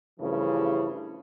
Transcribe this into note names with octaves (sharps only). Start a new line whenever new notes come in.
G2 C#3 E3 F3 A3 E4